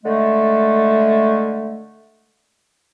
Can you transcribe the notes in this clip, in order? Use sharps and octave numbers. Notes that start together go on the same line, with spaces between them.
D3 G#3 A3